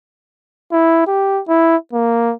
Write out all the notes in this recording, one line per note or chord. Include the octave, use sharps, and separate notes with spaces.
E4
G4
E4
A#3